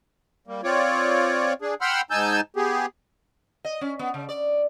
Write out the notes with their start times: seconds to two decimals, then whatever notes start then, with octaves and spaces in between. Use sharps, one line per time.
0.47 G3 A#3
0.64 C4 F4 C#5 D5
1.62 D4 G#4
1.81 F#5 G5 B5 C6 E6 F6
2.11 G#2 D#4 G#5 A5 E6 G6
2.56 B3 G4 G#4
3.65 D#5
3.81 C#4
3.99 B3
4.14 C#3
4.29 D5